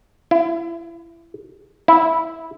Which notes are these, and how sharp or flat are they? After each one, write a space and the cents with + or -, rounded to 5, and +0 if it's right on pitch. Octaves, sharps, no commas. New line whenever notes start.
E4 +30
E4 -10